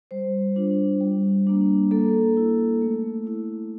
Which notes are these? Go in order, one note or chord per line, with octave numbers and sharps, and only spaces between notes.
G3 C5
D4 F4
G3
A#3 D4
A#3 A4
E4
A3
E4